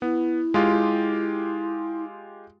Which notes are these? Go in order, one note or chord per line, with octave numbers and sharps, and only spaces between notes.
B3 E4
G#3 F4 G4